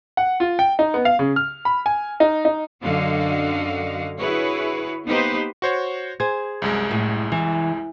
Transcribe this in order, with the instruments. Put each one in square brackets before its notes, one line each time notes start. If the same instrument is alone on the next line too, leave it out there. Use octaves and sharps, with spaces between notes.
[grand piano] F#5
F4
G5
D#4
B3
F5
C#3
F6
B5
G#5
D#4
D#4
[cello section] F#2 D3 F#4 D#5 F5
E4 F#4 G#4 B4 C#5
A#3 B3 D#4 G4 B4 C5
[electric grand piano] F#4 C5 C#5
[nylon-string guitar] G#4 C5 [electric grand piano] G#6
[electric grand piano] C2 F#2 G#3
[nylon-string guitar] A2
E3